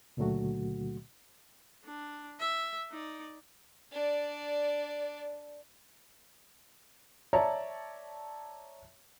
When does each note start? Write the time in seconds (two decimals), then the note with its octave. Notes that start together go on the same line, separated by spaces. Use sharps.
0.17 C#2 A#2 D3 F#3 A3 F#4
1.84 D4
2.40 E5
2.91 D#4 D5
3.92 D4 D5
7.33 C#5 D5 E5 A5 A#5